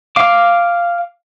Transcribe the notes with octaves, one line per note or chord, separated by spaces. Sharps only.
F5 D6